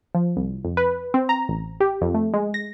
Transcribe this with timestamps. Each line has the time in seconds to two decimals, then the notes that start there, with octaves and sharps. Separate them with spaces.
0.15 F3
0.36 C2
0.65 F2
0.77 B4
1.14 C4
1.29 A#5
1.49 A1
1.80 G4
2.01 F2
2.14 A3
2.34 G#3
2.54 A#6